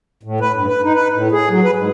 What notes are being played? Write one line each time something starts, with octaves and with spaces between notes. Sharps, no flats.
A2
B4
G2
B4
D#4
B4
A2
G#4
F#3
B4
G#2